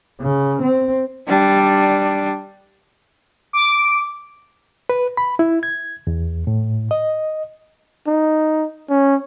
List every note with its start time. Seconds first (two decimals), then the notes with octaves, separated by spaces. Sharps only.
0.21 C#3
0.63 C4
1.27 G3 D4
3.53 D6
4.89 B4
5.17 B5
5.39 E4
5.63 G#6
6.07 E2
6.47 A2
6.91 D#5
8.07 D#4
8.90 C#4